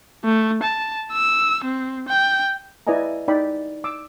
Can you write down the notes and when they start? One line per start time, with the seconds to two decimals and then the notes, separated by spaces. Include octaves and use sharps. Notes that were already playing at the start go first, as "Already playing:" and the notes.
0.25 A3
0.63 A5
1.13 E6
1.64 C4
2.09 G5
2.87 E4 B4 D5 D#5 G#5 A#5
3.28 D#4 D5 G5 B5
3.84 D6 E6